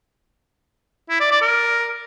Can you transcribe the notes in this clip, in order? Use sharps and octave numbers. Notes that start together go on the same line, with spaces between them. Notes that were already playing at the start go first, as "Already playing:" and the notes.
E4
D5
D5
A#4